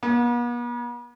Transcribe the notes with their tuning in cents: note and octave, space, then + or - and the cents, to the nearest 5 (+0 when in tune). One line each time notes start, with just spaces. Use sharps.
B3 -45